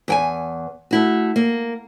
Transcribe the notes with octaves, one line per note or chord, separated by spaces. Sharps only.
E2 G5 G#5
A3 E4 F#4
A#3